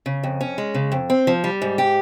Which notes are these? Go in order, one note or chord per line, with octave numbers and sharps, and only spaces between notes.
C#3
F2
C#4
G#3
C#3
F2
C4
F3
G3
G#2
G4